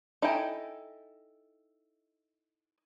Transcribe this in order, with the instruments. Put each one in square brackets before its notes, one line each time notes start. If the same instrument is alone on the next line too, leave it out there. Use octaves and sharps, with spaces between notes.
[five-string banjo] D#4 E4 A4 G5 G#5